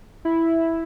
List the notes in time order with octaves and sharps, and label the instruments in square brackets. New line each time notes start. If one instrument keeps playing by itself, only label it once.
[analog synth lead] E4